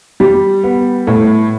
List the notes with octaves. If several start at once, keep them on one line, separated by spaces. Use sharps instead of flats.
G3
B3
A2